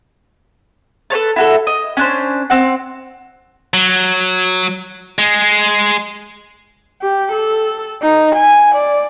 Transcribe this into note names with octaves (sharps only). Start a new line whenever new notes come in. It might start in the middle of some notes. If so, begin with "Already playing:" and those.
A4 B4 C#5 A5
E4 F#4 A4
D#5
C#4 D4 C5
C4 F#5
F#3
G#3
G4
A4
D#4
G#5
D5